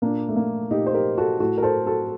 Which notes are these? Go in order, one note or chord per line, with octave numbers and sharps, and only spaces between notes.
A#2 A#3 D4
A3
A#3
A#2 D#4 G4
C5
G4 A#4
F#4 A4
A2 F#4 A4
A#4
A4 C5
F#4 A4